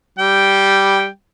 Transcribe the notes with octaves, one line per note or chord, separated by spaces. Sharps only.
G3 G5